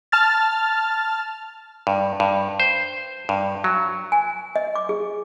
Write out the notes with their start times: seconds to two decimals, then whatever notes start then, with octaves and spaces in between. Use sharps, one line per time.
0.12 A5 F6 A6
1.87 G2
2.20 G2
2.60 C5
3.29 G2
3.64 F#3
4.12 G#5
4.56 D#5
4.75 D6
4.89 G#4